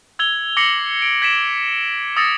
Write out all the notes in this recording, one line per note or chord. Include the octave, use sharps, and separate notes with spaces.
E6 G#6 F7 G7
D6 A#6 C7 C#7 F#7
D7
G#6 B6 D7 E7
D#6 E6 A6 A#6 C#7